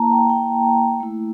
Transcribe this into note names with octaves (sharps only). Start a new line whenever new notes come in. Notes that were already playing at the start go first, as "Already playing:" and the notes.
Already playing: A#3 E4 A5 A#5
G5
G5
A3 E4